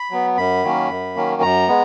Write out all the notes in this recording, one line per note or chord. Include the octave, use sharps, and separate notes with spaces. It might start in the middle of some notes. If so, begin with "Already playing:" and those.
Already playing: B5
F#3 B3
F#2 B5
D#3 F#3 A#3 C#4
F#2
D#3 F#3 A#3 C#4
F#2 A#5
G#3 B3